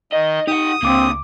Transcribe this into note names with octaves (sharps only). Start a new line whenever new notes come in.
D#3 D#5
D#4 G4 F#5 D#6
C#2 D3 A#3 C4 D6